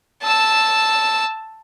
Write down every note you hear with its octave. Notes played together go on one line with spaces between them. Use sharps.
A5 E6